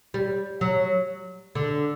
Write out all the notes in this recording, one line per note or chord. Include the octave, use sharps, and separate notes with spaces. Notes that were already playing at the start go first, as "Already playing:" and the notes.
G3
F#3
D3